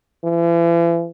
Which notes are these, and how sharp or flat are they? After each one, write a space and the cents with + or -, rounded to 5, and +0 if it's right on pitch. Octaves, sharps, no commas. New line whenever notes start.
E3 +40